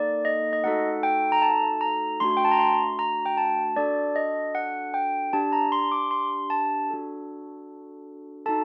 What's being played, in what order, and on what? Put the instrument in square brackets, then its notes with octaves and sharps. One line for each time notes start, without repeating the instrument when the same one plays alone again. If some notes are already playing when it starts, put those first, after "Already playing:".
Already playing: [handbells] A#3 D#4 A4 D5
D#5
D#5
A3 D#4 F#4 A4 F#5
G5
A#5
A5
A#5
A3 D4 F#4 C6
G5
A5
A#5
C6
A#5
G5
A5
D4 F#4 A4 D5
D#5
F#5
G5
D4 G4 A5
A#5
C6
D6
C6
A5
D4 F#4 A4
D#4 F#4 A4 A5